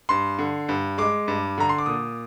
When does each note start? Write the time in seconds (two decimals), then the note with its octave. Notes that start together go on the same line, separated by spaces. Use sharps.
0.09 G2 C6
0.38 D3
0.69 G2
0.98 G#3 D6
1.28 G2
1.58 D3 A#5
1.69 C6
1.78 D6
1.86 A#2 D#6